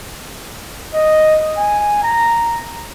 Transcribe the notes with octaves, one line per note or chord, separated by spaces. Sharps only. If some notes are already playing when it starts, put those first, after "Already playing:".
D#5
G#5
A#5